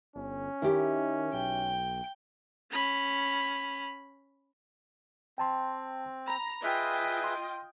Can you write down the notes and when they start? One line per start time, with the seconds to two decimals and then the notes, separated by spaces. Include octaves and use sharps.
0.16 G1 C#4
0.62 D#3 E4 G4
1.33 B1 G5
2.71 C#4 B5
5.38 C4 G5 A5 C6
6.28 A#5 B5
6.64 F4 G#4 B4 D#5 E5 G5
7.24 C6